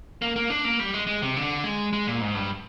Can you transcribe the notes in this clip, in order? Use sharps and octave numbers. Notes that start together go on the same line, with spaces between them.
A#3
A#3
D4
A#3
G3
G#3
G#3
C3
D3
G#3
G#3
A#2
G#2
G2